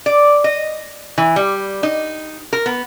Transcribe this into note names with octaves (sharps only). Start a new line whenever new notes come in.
D5
D#5
E3
G3
D#4
A#4
B3